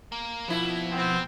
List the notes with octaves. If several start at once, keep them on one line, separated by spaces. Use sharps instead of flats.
A#3
B2 F3 A#3 E4
B3 C4